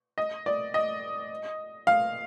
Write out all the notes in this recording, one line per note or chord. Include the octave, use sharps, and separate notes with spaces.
D#5
D5
D#5
F5